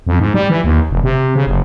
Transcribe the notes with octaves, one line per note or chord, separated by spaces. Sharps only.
F2
G#2
G3
E3
D#2
F1
C3
C#3
F#1